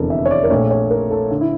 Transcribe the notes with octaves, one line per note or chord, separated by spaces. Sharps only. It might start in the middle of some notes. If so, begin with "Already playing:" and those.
Already playing: F1 E2 D3 A4 A#4
E5
C#5
D5
A#4
A#1 A#2 A3 C#5
C#5
A#4
A4
D3
E4